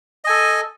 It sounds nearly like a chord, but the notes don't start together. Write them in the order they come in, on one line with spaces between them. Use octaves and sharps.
D#5 G#5 A4